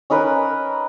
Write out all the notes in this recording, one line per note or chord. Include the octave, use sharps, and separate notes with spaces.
C#4 D#4 A#4 B4